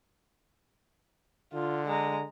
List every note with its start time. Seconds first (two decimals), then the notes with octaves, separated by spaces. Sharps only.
1.53 D3 F4
1.87 G#3 A#5